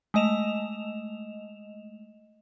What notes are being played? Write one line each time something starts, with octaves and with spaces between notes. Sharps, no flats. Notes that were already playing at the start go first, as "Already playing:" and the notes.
G#3 A3 D#5 E7 F7